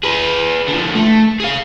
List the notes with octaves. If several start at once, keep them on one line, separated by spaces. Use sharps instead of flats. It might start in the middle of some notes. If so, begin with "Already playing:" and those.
G#4 B4
D3 F3
A3
G#4 F5